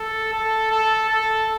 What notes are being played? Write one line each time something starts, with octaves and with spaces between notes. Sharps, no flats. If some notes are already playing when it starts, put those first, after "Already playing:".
Already playing: A4
A4
A4
A4